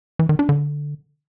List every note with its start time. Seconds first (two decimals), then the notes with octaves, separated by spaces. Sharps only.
0.19 E3
0.29 D#3
0.39 D4
0.49 D3